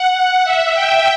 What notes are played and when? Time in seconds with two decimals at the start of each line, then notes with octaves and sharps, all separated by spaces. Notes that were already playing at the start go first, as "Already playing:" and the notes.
Already playing: F#5
0.45 E5
0.74 G5